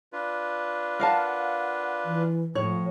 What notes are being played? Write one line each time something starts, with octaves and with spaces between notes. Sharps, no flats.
D4 F4 B4
A#4 F5 F#5 A5
E3
A2 F3 C#5